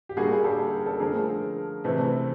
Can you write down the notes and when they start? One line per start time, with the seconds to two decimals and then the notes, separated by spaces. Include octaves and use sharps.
0.09 G4
0.16 D3 G3 A#3 F#4 G#4
0.44 G4 A4
0.73 A#4
0.86 A4
1.00 D3 F3 A3 G#4 A#4
1.84 C3 E3 A3